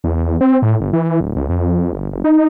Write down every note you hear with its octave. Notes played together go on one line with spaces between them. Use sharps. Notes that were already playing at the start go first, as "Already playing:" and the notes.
E2
C4
A2
G1
E3
D1
C#2
F2
G1
F#1
D#4